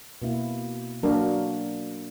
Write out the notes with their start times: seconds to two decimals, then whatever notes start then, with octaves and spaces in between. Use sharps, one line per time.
0.22 B2 A#3 E4
1.03 F#3 A#3 D4 A#4